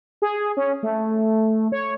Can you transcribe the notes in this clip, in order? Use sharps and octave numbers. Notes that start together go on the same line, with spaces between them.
G#4
C#4
A3
C#5